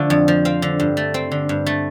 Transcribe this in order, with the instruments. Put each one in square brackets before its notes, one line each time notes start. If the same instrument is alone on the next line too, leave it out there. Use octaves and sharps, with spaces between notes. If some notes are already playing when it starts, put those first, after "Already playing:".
Already playing: [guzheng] D3 F3 A3
F2
F3
C4 F5
D3
G2
A3
C4
D3
G2
A3